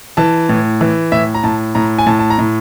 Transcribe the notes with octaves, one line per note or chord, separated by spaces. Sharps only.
E3 A5
A2
E3
A2 E5
A#5
A2 A5
A2 A#5
G#5
A2 A5
A5
A#5
A2